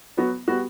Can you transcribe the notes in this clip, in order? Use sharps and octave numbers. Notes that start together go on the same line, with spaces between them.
F#3 B3 F#4
G3 B3 F#4